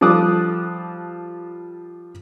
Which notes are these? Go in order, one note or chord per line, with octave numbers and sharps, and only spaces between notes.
F3 G3 A4 D6 D#6 F#6